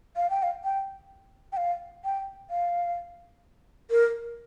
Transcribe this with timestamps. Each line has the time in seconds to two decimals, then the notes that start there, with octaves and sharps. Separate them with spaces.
0.16 F5
0.30 G5
0.43 F5
0.64 G5
1.52 G5
1.57 F5
2.05 G5
2.50 F5
3.90 A#4